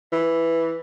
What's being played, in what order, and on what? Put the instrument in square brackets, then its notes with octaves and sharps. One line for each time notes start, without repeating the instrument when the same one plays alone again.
[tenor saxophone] E3